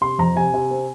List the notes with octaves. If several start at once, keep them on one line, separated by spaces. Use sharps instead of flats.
C3 C6
F2 A#5
C3 G#5
C3
C4